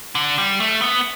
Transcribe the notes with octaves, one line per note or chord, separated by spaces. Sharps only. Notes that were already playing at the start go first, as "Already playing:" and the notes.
D3
G3
A3
B3